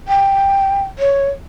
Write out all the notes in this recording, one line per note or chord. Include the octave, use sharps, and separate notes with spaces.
G5
C#5